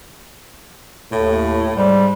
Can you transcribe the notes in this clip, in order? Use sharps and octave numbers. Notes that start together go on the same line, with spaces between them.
D#2 A2
G#2 G3